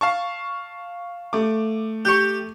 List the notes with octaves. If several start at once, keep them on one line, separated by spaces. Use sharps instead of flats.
F5 A5 C#6
A3 D6
G4 C#6 G6